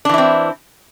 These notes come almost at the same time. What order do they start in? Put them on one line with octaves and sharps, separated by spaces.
D4 E3 E4 C4